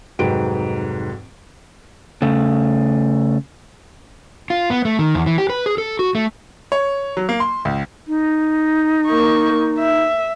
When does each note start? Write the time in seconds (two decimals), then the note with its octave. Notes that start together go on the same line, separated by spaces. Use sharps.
0.19 F1 G#2 F#3 B4 G5 D7
2.22 C#3 A3
4.50 F4
4.70 B3
4.85 A3
4.99 D#3
5.15 E2
5.26 E3
5.38 G4
5.50 B4
5.66 G#4
5.78 A4
5.99 F#4
6.15 A3
6.72 C#5
7.17 F#3
7.29 A#3
7.40 C6
7.65 C#2
8.07 D#4
9.06 A#3 C#6
9.79 E5